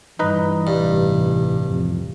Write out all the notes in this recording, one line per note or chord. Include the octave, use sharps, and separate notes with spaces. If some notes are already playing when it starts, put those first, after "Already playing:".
G2 E3 D#4 B4 D#5
A1 G2 C3
F2